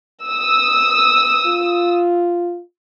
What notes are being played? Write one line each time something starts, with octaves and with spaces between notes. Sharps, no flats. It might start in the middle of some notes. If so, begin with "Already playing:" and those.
D#6 E6
F4